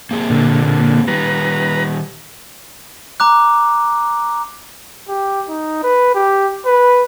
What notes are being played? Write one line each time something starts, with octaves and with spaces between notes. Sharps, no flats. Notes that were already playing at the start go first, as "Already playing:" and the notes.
A#3 C4 G#4
A#2 D3
D#3 G3 B4 A#5
A#5 D6 F#6
G4
D#4
B4
G4
B4